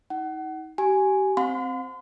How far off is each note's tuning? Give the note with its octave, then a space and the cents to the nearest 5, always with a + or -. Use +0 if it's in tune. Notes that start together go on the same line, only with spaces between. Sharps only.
D#4 +35 F#5 +30
G4 -30 G#5 +0
C4 +0 F5 +45 C6 -40